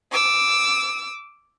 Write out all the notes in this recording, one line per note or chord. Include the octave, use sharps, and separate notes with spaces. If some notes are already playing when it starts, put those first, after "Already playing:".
D6 E6